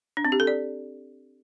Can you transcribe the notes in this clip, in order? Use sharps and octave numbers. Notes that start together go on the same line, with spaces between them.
D4
C4
G4
A4
D5